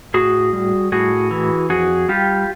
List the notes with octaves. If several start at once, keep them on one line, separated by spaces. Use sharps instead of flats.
A2 F#4 G#4
G3
A2 F#4 G#4
E3
F2 F#4 G#4
G3 F4 G4